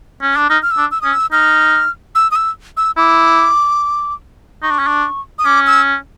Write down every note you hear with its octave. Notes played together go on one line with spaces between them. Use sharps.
C#4
D4
D#4 F6
F6
E6
D4
E6
C#4 D#6
E6
D#4 F6
E6
D#6
E6
E6
E4 D6
D#4 C#6
D4
C#4
D4
D#6
C#4 D6
E6